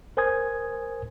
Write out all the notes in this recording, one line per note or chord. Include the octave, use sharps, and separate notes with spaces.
A#4 C5 G#5 D#6 G#6